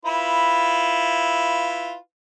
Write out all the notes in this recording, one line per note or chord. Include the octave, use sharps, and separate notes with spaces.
E4 F4 B4